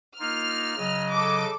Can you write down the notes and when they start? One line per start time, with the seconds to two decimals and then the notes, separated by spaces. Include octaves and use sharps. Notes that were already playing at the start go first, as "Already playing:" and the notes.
0.20 A#3 D#4 F4 F6
0.78 C#3 F#3 D#5
1.12 A4 D6